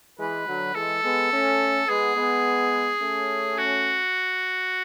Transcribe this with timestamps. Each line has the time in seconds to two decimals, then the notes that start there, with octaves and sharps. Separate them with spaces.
0.18 E3 G#3 B4
0.47 D3 F#3
0.75 E3 G#3 A4
1.03 G#3 B3
1.32 A3 C#4
1.88 G#3 B3 G#4
2.17 G#3 B3
3.01 A3 C#4
3.58 F#4